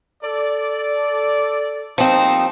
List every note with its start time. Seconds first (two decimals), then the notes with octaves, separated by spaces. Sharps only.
0.23 A4 D5
1.98 F3 G3 A#3 C4 D#4